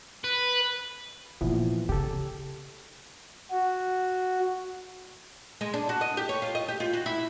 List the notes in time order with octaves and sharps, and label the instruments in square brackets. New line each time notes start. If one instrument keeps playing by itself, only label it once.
[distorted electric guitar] B4
[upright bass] A#2 [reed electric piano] E3 F3 B3
[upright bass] C#3 [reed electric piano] G4 A4
[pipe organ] F#4
[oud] G#3
D4
F#4
D#5
G4
C#5
F4
D#5
G4
F4
F#4
E4